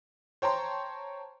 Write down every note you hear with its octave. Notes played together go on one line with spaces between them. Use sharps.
C5 C#5 G5 A5 A#5 C6